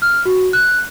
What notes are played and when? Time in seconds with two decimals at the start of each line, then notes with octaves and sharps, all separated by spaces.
0.02 F6
0.26 F#4
0.53 F#6